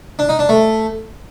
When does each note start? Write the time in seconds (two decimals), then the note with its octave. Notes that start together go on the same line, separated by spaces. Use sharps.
0.19 D4
0.29 D#4
0.39 D4
0.49 A3